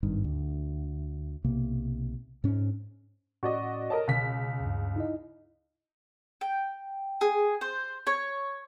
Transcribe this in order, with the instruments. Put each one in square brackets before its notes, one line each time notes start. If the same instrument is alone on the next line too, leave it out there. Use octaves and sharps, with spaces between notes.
[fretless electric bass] G#1 G2 D#3
D2
B1 C3 A#3
G#2 C#4
[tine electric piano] A2 C#4 C#6 [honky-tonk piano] F#4 D5 D#5
[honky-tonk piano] A#4 D#5 A5 [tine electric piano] C#5
[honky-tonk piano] C#2 B6 [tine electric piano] B2
[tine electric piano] D2 G2
D#4 E4 D#5
[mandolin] G5
G#4
C5
C#5